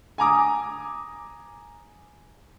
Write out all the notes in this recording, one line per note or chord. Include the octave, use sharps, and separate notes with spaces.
G#5 A#5 D6 D#6